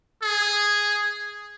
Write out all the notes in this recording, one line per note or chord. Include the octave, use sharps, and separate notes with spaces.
G#4